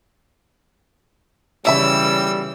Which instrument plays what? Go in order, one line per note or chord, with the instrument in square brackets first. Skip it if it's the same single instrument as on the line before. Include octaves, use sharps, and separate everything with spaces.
[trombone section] B1 G3 [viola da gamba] C#3 E3 [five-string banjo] C#5 E5 B5 [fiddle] E6